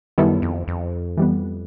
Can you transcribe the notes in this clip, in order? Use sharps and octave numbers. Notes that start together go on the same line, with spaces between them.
F#2 D#3 G3 B3 E4 A4
F2
F2
E3 G3 B3